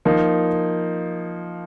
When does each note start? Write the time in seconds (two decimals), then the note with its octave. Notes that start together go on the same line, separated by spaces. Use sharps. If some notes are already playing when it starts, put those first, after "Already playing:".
0.05 F3 A#3 D#4